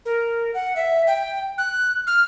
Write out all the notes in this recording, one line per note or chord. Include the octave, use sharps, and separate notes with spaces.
A#4
F#5
E5
G5
F#6
F6